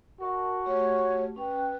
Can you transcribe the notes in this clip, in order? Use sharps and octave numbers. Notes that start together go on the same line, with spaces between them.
F#4 A#4 D#5 A5
A3 G4 C#5
C#4 B4 G5